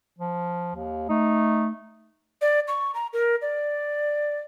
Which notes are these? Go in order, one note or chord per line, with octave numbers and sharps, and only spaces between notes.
F3
D#2
A3 D#4
D5
C#6
A#5
A#4
D5